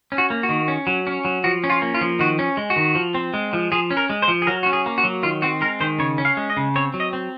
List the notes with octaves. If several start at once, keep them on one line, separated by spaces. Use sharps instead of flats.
C#4
F#4
A#3
F#4
D#3
C#4
F#3
C#4
F#3
F3 F#4
C#4
F4
A#3
F4
F3
D#3 F#4
C#4
G#3
F#4
D#3
F3
C4
G#3
F3
F3 G#4
C#4
A#4
G#3
C5
F3
G#4
F#3 A#4
C#4 F#4
G#4
A#3
F#4
F#3
D#3 F4
C4 F#4
G#3 A#4
D#3 C5
C#3 C#5
C#4
F5
G#3
D#5
C#3
C4 C#5
F#3
D#5
C4